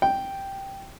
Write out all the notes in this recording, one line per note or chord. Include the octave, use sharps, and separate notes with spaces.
G5